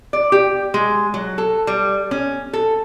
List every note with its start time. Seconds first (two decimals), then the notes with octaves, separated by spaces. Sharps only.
0.13 D5
0.32 G4
0.74 G#3
1.14 F#3
1.38 A4
1.67 G3
2.11 C#4
2.53 A4